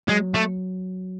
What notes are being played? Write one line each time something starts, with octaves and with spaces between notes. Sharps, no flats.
F#3 G#3
A3